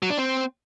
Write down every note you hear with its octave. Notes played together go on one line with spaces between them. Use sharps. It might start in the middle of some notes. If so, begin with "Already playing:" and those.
F#3
D4
C4